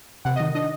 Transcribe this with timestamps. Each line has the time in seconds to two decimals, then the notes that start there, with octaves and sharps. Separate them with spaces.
0.25 C3 F#5
0.36 D#5
0.40 D#3
0.55 D4 D#5